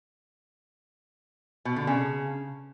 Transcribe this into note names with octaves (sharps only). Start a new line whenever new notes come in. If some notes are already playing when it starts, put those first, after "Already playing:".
B2
D3
C#3